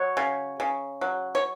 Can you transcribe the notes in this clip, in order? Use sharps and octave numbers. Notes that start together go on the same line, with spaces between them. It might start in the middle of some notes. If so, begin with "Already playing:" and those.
Already playing: F#3 C#5
C#3
C#3
F#3
C#5